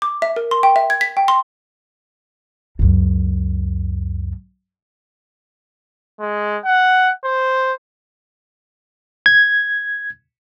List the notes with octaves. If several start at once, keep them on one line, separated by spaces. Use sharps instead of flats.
D6
E5
A#4
C6
G5
E5
G#6
B6
G5
C6
C#2 F#2
G#3
F#5
C5
G#6